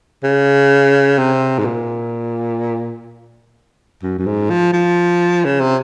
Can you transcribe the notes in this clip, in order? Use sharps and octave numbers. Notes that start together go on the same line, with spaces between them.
C#3
C3
G#2
A#2
F#2
F#2
G#2
F3
F3
C#3
C3